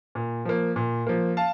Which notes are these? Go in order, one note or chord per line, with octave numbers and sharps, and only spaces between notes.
A#2
F3 A#3
A#2
F3 A#3
F5 A5